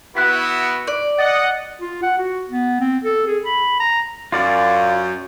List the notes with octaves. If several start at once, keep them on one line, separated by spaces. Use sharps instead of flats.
B3 E4 F#4 F#6 B6
D5
D#5 F#5 A6
F4
F#5
F#4
B3
C4
A4
G#4
B5
A#5
F#2 F4 D5 F5